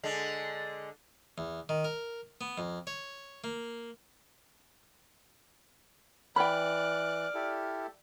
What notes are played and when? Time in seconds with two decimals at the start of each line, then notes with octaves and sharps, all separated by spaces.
0.03 D3 G#3
1.38 E2
1.69 D#3
1.85 A#4
2.41 B3
2.58 F2
2.87 C#5
3.44 A#3
6.36 E3 D5 G5 B5 F6 F#6
7.34 E4 G4 A4